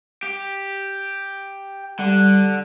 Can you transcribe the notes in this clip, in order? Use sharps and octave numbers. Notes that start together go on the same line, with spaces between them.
G4
D3 G3